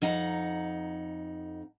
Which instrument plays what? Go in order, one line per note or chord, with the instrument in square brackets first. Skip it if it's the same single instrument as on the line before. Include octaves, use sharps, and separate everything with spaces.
[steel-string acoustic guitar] F2 D#4 F#5 A#5